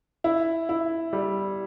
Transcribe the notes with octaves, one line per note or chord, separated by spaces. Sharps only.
E4
E4
G3